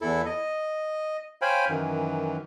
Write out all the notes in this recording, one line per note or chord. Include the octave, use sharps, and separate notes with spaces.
E2 E4 A4
D#5
C5 C#5 F5 G5 G#5 B5
F#2 D#3 E3